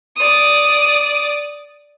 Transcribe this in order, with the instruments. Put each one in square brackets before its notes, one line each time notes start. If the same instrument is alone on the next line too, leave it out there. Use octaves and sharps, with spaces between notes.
[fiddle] D5 D#6